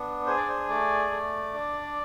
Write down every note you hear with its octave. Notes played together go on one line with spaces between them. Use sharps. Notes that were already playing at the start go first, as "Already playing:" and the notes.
Already playing: B3 D4
G#4 C5
D5
C5
A3 D5
A3
D4